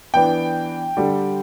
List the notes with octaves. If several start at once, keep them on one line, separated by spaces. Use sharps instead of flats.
E3 B3 D4 G5
D3 G3 D4